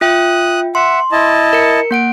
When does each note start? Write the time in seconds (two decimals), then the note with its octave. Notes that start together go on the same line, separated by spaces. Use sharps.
0.01 F4 E5 G5 D#6 F#6
0.75 E5 F#5 C6
1.12 E4 D#5 A5
1.53 A#4 C#7
1.91 A#3 F#5 D7